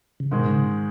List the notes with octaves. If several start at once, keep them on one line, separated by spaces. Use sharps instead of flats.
C#3
G#2 B2 D#3 G#3
C#3